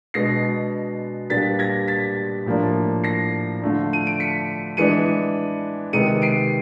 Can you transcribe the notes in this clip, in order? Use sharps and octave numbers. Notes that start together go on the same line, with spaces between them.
B2 G#3 B3 D4 A#6 C7
A#2 G3 B3 D4 A6 B6
G#6 A#6
A6 B6
A2 F3 A#3 D4
A#6 C7
D3 F3 A3 D4
D#7
D7
B6 C#7
E3 G#3 B3 D4 C#7 D#7
C3 D#3 G#3 B3 C#7 D#7
C7 D7